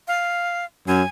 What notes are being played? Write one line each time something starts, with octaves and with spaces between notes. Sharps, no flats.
F5
F#2 G#5